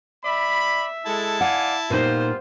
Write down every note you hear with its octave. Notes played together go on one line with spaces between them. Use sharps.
D5 E5 B5
G#3 E4 A4 A5
D5 F5 F#5 G#5
A#2 G3 B3 D#4 F4 C5